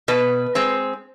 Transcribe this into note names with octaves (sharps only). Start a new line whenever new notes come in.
B2 B4
G#3 C4